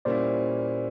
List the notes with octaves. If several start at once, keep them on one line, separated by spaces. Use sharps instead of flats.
A#2 G3 A#3 C#4 E4 C5 D5